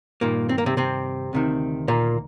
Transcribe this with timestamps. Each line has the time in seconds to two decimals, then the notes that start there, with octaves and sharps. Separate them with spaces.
0.21 G2 A#2 D#3 A#3
0.49 C4
0.58 A#3
0.66 C3 C4
0.77 C3 C4
1.33 D2 C3 D#3
1.88 A#2 A#3